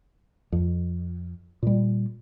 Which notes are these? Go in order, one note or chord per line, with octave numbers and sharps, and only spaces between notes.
F2
A#2 G3